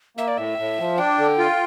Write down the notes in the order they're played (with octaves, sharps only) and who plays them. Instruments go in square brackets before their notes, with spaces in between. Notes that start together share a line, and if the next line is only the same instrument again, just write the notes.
[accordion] A#3 [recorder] E5
[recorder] D5
[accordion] A2 [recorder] E5
[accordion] A2
F3
[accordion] D4 [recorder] G5
[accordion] D3
F4